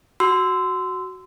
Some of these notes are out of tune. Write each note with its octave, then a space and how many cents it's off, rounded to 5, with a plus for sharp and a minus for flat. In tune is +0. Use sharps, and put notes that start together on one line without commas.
F#4 +0 C6 -20 E6 +0